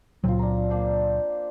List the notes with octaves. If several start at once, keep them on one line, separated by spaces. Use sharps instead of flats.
C#2 A#2 F#3 C4 F4
D4 A#5
A#3 D4 C5